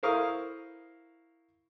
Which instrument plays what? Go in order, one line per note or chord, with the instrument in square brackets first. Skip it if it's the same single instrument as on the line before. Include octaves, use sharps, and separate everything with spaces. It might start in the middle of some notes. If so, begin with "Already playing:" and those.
[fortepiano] E4 A#4 C5 F5 C#6 D#6